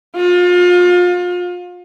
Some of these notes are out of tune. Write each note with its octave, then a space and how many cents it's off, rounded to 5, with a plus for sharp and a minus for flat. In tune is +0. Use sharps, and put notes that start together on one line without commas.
F4 +30